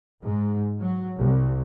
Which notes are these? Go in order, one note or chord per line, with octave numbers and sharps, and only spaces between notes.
G#2
F#3
C2